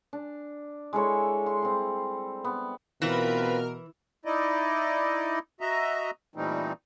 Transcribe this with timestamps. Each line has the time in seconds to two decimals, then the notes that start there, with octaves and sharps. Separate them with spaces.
0.13 D4
0.93 G#3 E4 A4 C#5
1.46 C6
1.62 G3 C4
2.44 B3
3.02 B2 E3 C4 F4 A#4 B4
4.25 D#4 E4 D5 D#5
5.61 F#4 D#5 E5 A#5
6.36 A#2 E3 G3 A3 C4 D#4